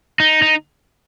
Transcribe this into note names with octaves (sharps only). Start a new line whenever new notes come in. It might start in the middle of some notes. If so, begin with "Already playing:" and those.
D#4
D#4